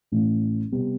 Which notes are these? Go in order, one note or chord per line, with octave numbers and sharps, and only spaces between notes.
A1 A2 E3
C3 G3 B3